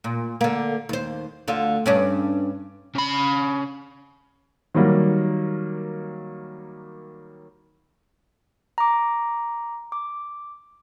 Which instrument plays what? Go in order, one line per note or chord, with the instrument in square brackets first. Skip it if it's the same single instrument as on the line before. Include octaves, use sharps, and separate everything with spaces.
[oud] A#2
D3 A#3
D#2 C5
D2 D3 F4
G2 C#4 D4
[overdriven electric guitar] C#3 B5
[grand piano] D#3 F#3 G3 A#3
[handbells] A#5 D6
D6